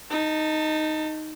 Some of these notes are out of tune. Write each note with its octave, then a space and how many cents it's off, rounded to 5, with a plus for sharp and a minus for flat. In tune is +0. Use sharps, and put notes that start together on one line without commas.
D#4 +0 A5 +25